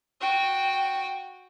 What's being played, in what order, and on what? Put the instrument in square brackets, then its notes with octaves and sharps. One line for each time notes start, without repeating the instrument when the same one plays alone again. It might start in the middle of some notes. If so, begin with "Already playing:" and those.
[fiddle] F#4 G5